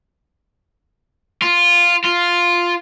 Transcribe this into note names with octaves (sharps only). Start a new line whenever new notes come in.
F4
F4